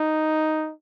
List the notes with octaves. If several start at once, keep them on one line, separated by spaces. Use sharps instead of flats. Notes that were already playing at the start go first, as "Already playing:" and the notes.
Already playing: D#4